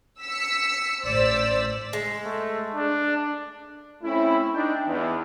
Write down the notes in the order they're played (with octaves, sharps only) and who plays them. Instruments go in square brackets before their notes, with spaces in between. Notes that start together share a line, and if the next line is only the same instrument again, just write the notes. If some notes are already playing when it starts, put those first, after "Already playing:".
[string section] E6 B6 C#7
A1 C5 D5 E6 B6
[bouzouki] G#3
[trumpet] A3
D4
[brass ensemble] A3 C4 C#4 E4
D4 D#4 G5
E2